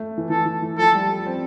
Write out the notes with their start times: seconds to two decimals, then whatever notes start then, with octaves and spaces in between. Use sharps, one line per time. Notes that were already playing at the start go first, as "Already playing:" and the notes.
Already playing: A3
0.18 E3
0.30 E3 A4
0.46 E3
0.62 E3
0.78 F3 A4
0.95 G3
1.27 C4